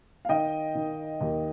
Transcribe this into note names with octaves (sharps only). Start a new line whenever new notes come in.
F5
D#3 D#5 G5
D#3
D#2